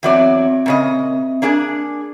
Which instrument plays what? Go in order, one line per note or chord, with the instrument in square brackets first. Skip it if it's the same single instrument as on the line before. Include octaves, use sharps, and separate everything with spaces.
[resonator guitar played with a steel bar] E2 F#3 D5 [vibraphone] C4 E5
[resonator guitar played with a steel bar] A#2 C#3 D#5
A#3 D4 G#4